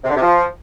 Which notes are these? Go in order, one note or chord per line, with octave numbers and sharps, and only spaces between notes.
C3
D3
C3
F3